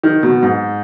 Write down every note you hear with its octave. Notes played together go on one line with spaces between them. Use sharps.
D#3
B2
G#2